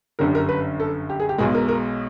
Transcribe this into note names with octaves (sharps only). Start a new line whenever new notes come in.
G1 F#2 D3 G3 A#4
A#4
B4
A4
G4
G#4
G4
B1 B2 G#3 G#4
A#4
A#4